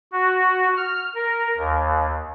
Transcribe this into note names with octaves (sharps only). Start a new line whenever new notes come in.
F#4
F6
A#4
D#2